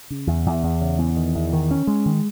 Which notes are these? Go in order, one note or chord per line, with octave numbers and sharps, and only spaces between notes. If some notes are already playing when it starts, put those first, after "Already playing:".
C#3
E2
E2
E2
C#3
E2
D#3
E2
D#3
C#4
G#3
D#3